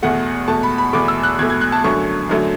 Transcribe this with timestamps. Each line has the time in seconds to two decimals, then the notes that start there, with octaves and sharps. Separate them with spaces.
0.02 E2 B2 A3 F#5
0.48 E2 B2 A3 A5
0.63 B5
0.78 B5
0.93 E2 B2 A3 D6
1.08 E6
1.23 F#6
1.39 E2 B2 A3 G#6
1.50 G#6
1.61 F#6
1.72 A5
1.84 F#2 D3 F#3 A3 C#6
2.29 F#2 D3 F#3 A3